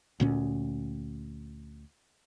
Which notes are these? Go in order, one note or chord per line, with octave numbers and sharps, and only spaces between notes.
D2 A#2 C#4